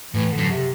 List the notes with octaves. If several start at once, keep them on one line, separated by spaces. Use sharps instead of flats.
A2 E3
D3
F#2
C3